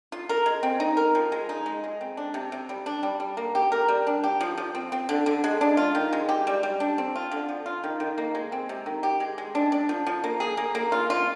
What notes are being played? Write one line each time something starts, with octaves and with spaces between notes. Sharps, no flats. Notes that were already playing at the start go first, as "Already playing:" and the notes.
F4
A#4
G#3
C4
D#4
A#4
F3
G#3
D#4
G#3
G#3
C4
D4
C3
C3
G3
D4
G3
G3
A#3
G4
A#4
G3
D4
G4
F3
F3
C4
C4
D3
D3
G#3
D4
F4
D#3
G#3
G4
G3
G3
D4
C4
F4
D3
F3
F4
D#3
D#3
A#3
G#3
C4
C3
D#3
G4
G#3
G#3
D4
D4
F3
F3
A#3
G#4
A#3
A#3
F4
F4